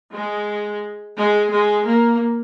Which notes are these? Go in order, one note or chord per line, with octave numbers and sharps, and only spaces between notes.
G#3
G#3
G#3
A#3